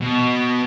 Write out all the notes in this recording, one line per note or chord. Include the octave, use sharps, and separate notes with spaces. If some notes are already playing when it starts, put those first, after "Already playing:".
B2